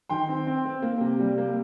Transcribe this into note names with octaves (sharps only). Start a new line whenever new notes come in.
D#3 G5 C6
C4
C4
C4
A#3
C3
G3
A#3